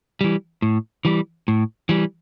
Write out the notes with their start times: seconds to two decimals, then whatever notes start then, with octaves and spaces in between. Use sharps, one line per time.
0.21 E3 G3
0.62 A2
1.05 E3 G3
1.48 A2
1.89 E3 G3